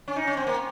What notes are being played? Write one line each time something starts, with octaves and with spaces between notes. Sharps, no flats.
C#4
D#4
C#4
C4
A#3